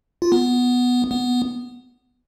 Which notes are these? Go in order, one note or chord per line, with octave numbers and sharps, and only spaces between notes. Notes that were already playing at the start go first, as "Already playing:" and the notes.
F4
B3
B3